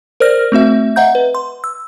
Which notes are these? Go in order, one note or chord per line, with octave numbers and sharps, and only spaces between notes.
A#4 C5 D5 F6 A#6
A3 C4 F#4 E5
D#5 E5 F#5 A#5 G6
B4
C6
E6